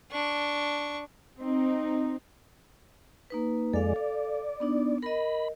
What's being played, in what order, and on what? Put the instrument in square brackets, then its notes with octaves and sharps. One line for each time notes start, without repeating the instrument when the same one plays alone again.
[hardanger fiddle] D4 C#6
[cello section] C4 D#4
[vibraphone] A#3 D#4 B4
[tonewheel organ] F2 G#3 D5 [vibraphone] A4 F5
[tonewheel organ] D5
[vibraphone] B3 D4 D#4
[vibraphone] A#4 D#5 [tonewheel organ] B5